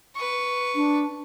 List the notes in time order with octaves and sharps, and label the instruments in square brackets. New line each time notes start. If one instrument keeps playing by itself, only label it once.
[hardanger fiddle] B4 C#6
[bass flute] D4